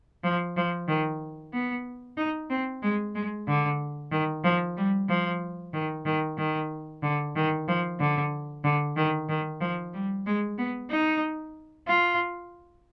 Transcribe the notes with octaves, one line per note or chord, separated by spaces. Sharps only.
F3
F3
D#3
B3
D#4
C4
G#3
G#3
D3
D#3
F3
G3
F3
D#3
D#3
D#3
D3
D#3
F3
D3
D3
D#3
D#3
F3
G3
G#3
B3
D#4
F4